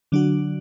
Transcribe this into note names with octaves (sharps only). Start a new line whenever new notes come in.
D3 F#3 D4 F#4